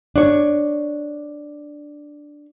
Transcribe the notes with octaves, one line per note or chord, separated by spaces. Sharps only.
D4 C#5